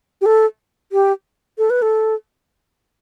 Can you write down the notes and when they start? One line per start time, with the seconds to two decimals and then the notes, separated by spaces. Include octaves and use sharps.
0.21 G4
0.26 A4
0.92 G4
1.58 A4
1.70 B4
1.82 A4